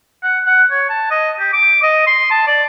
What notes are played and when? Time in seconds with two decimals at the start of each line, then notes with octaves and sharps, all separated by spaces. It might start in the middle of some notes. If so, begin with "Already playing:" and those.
0.23 F#5
0.46 F#5
0.71 C#5
0.90 A5
1.11 D#5
1.40 G4
1.53 D6
1.83 D#5
2.07 C6
2.31 A5
2.47 D5